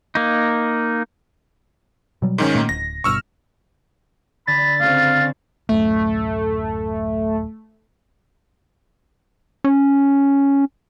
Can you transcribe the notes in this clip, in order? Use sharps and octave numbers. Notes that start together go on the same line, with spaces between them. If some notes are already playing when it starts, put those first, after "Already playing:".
A#3 D#4
B2 F#3 G3
G#2 D#3 C#4
A#2 A3 A#3
D1 A#6
G1 G2 B2 C#6 E6 F6
D3 B5 A6
C#3 C4 F5
D1 F#2 A3
C#4